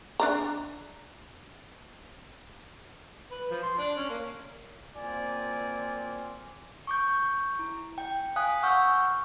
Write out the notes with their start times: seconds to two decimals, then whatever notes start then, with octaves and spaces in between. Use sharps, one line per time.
0.20 D4 D5 A#5
3.31 B4
3.51 F3
3.63 C6
3.78 D4
3.97 C#4
4.10 A#3
4.95 A#3 C4 F4 D5 G#5
6.87 C#6 D6 G6
7.59 E4
7.98 G5
8.36 F5 G#5 D#6 F#6
8.63 F#5 C#6 E6 F6 G6